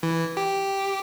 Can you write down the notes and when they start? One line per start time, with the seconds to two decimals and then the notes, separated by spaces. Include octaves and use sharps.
0.03 E3
0.37 G4